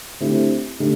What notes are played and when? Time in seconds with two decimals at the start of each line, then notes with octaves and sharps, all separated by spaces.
0.20 D3 A3 C4 E4 G4
0.80 D3 A3 G4